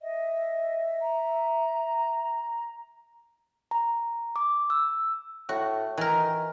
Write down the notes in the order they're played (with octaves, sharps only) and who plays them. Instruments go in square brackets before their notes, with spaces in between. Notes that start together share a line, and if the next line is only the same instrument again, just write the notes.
[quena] D#5 [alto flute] E5
[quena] A#5
[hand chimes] A#5
D6
E6
[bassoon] A2 [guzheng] F#4
[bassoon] D#3 [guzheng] E3 A#4